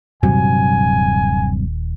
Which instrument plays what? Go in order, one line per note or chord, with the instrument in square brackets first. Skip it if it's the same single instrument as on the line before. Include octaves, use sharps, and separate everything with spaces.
[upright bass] D#1 [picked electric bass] G2 C3 F#3 [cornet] G#5